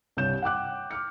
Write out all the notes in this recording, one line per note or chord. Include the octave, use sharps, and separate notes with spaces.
C2 G2 C#5 G6 E7
F#5 G5 D6 F#6
D6 F6 C#7